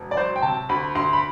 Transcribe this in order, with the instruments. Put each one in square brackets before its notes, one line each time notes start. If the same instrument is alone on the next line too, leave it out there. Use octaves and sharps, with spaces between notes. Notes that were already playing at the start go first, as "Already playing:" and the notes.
Already playing: [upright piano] E1
D5
F#3 C5
G5
C3 A5
D2 B5
D2 C6
B5